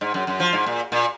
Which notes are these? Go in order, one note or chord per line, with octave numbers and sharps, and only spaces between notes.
G#2
F#2
F#2
F3
G#2
A#2
A#2